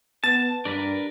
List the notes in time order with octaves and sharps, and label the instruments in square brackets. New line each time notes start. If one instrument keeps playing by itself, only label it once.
[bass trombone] B3 [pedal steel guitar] A5 [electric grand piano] A6
[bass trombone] G2 [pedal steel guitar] D4 A#4 B4